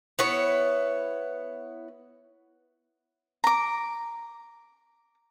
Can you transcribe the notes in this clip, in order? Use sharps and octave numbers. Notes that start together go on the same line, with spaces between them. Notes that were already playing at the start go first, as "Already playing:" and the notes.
B3 E4 C#5
A#5 D6